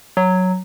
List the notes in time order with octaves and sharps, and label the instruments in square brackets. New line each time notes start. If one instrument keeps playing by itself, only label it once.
[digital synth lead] F#3